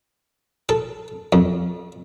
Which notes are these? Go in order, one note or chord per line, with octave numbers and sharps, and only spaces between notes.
A4
F2